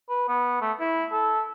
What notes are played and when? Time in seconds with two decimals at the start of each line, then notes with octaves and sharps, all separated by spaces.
0.09 B4
0.28 B3
0.61 A3
0.80 E4
1.12 A4